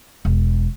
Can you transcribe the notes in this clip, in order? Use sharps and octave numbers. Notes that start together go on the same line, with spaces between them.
E1